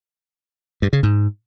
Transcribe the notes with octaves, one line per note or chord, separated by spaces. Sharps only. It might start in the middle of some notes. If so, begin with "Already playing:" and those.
G2
C#3
G#2